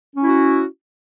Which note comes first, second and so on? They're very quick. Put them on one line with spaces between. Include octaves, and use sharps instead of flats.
C#4 E4 F#4